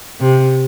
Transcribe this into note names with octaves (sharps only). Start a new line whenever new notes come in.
C3